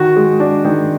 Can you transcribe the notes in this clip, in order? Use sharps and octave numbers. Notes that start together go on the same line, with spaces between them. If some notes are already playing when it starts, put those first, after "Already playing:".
Already playing: D#3 F#4
G#3
D4
D#3